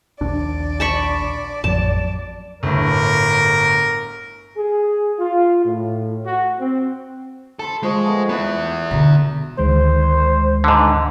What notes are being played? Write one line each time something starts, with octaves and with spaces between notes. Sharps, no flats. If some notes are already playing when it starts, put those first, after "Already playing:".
A#1 D#2 D4 D5
A5 B5 C#6
A1 F2 F#3 A5
G1 A2 A#4
G#4
F4
A2
F#4
C4
A4 A5 B5 C6
F3 G#3 D#5 C#6
A3 B3
B3 E4 B4
B2 D3 A#5
D2 D#3 G#3 C5
G#2 D3